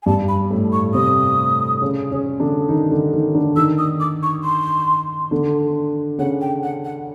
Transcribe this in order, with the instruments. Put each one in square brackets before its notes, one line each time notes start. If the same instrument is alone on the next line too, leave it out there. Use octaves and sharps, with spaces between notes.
[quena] G#5
[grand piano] G2 G3 [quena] A5
[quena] B5
[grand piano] A2 A3
[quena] C#6
[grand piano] C3 C4 [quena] D#6
[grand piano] C#3 C#4
C#3 C#4
D3 D4
D#3 D#4
D3 D4
D#3 D#4
D3 D4
[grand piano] D#3 D#4 [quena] E6
[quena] D#6
D6
C#6
C6
[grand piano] D3 D4
[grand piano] C#3 C#4 [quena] F#5
[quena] G5
F#5
F#5